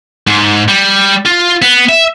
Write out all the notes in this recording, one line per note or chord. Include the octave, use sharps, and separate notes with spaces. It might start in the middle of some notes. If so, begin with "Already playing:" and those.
G#2
G3
F4
B3
E5